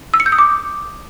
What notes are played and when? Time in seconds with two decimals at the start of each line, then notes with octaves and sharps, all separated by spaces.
0.14 E6
0.20 C#7
0.26 G6
0.32 D#6
0.38 D6